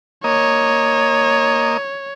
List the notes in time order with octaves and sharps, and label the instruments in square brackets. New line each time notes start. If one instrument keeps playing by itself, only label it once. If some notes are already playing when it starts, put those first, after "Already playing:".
[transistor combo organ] A#3 D#5 [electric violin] C#5